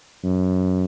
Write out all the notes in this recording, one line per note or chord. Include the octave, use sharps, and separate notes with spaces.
F#2